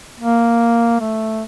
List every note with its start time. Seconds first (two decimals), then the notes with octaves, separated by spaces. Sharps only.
0.20 A#3
1.00 A3